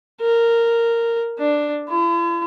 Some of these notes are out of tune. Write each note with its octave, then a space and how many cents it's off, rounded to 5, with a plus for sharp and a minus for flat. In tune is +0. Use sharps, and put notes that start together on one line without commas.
A#4 -10
D4 +5
E4 +45